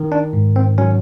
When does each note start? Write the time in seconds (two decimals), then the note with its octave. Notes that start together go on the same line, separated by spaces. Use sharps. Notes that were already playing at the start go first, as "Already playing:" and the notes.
Already playing: D#3
0.12 D4
0.33 G#2
0.56 C4
0.78 F#3 C#4